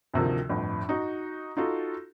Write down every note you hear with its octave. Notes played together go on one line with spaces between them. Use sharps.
D2 C3 D#3 F3
G1 F2 A2
D#4 F#4
D#4 F4 F#4 A4